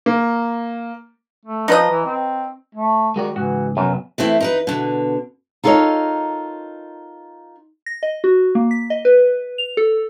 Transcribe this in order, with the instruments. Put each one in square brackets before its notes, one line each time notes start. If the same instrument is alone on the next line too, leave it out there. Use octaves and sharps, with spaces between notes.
[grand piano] A#3
[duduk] A3
[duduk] F3 [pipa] D#4 B4 D#5
[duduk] E3
C4
[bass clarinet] A3
[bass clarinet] D#3 [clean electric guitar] G#3 F#4 D5
[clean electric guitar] C#2 G#2 [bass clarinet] E3 [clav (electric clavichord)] F#4
[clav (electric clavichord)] F#2 [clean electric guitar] C3 F#3 B3
[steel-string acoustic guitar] E3 A3 C4 E4
D#4 A#4 B4
B2 D3
[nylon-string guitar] D#4 F4 A4 A#4 C#5 D#5
[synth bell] A#6
D#5
F#4
A#3
B6
D#5
B4
F7
A4